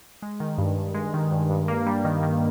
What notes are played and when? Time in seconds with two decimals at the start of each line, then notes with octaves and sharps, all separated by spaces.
0.22 G#3
0.40 D#3
0.58 G2
0.77 G2
0.95 G#3
1.14 D#3
1.32 G2
1.50 G2
1.68 A#3
1.87 G3
2.05 D#3
2.23 D#3